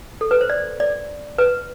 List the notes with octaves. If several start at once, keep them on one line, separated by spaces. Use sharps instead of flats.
A4
B4
C5
D5
D5
B4